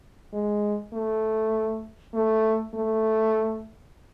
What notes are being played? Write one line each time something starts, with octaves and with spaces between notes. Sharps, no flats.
G#3
A3
A3
A3